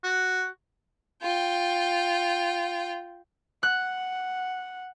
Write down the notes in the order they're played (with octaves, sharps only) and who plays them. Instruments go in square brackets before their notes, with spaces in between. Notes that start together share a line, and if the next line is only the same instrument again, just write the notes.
[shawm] F#4
[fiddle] F4 G5
[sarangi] F#5 [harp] F#6